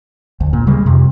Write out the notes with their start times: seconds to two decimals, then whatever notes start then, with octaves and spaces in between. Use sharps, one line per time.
0.40 D2
0.53 A#2
0.67 C#3 G3 G#3
0.86 F2 C3